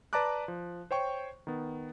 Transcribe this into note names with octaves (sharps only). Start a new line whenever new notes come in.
B4 D5 A5 A#5 D6 F#6
F3
C5 C#5 G5 C#6
D#3 B3